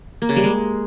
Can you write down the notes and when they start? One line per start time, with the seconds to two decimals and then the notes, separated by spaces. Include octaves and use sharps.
0.22 A#3
0.29 C#3
0.36 G3
0.44 G#3